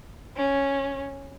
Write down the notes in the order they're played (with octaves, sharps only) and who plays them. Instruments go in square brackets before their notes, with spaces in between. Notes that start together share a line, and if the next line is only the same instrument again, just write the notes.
[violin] C#4